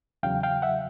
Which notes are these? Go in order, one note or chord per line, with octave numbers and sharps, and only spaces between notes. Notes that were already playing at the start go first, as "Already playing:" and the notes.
E2 C#3 F#3 F5 G5
F5 G5
E5 F#5